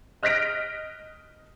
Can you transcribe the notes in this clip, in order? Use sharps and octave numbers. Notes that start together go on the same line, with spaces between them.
D#5 F6 F#6 A#6 B6 D7